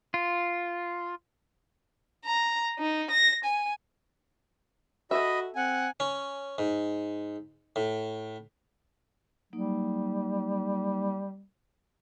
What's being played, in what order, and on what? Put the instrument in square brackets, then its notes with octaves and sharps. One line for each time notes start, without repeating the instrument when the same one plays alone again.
[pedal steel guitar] F4
[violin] A#5
D#4
A#6
G#5
[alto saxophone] F#4 [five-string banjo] A4 E5 [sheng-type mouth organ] D#5 B5
[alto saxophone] C4 [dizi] F#5 [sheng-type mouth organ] G#5
[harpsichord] C#4
G#2
A2
[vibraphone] F#3 A#3 D#4 [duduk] G3